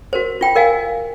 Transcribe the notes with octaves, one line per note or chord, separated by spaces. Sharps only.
F#4 A#4 C5
F4 G5 B5
A#4 D#5 F5 G#5